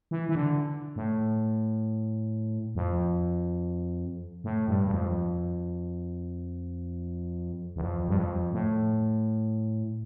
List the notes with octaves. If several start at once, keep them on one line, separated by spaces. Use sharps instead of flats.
E3
E3
D3
A2
F2
A2
G2
G2
F2
E2
F2
G2
F2
A2